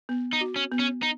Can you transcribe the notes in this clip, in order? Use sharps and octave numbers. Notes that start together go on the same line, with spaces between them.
B3
D#4
F#4
C#4
B3
C#4
D#4